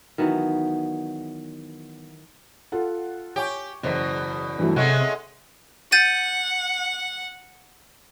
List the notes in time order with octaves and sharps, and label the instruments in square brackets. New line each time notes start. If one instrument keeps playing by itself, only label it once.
[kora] D#3 E3 F#3 B3
[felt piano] F4 A4 F#5
[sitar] G4 [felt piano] C#5 G#5 C#6
[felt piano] F#1 C5 B6 [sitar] E2 B2
[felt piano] G2 F#3 A3 [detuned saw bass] E3
[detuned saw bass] C3 [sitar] G#3 A3 C#4 [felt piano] F#5
[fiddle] F#5 [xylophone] G6 A6 D#7